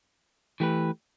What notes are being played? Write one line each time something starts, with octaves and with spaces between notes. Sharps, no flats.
E3 A3 G4 B4